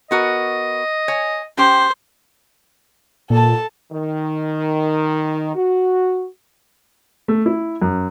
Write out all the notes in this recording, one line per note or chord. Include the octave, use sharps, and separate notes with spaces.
B3 F#4 A#4 D#5
C#5 G#5
C#4 G4 C5 G5
A#2 A4 A5
D#3
F#4
A3
E4
F#2